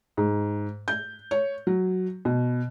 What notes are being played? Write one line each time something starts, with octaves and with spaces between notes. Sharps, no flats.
G#2
G6
C#5
F#3
B2